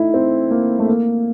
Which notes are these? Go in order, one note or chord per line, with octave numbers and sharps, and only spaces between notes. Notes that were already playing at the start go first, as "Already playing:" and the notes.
Already playing: A3 D#4 E4
C4
A#3
A3
A#3